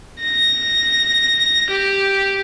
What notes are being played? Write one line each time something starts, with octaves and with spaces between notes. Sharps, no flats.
A#6
G4